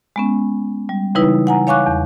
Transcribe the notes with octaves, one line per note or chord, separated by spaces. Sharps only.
G#3 B3 C#4
G3
C#3 E3 G3 D#4 E4 B4
F#5 G#5 A#5
C#5 F5 G#5 C#6 D6 F#6
E2